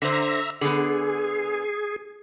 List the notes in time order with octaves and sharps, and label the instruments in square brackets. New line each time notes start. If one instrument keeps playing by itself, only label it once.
[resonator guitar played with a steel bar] D3 C5 [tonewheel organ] E5 A#5
[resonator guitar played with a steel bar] D3 B3 [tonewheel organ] G#4